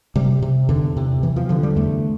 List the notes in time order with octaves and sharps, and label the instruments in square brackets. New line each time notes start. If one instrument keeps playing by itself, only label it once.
[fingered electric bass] C3 G3
C3
E2 D3
C3
E2 E3
F3
D3 F3
G3
E2 A3